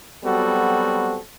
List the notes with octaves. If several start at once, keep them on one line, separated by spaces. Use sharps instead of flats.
F#3 G3 B3 C4 F#4 A4